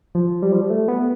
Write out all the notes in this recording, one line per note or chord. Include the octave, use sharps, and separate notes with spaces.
F3
G3
F3
G3
A3
B3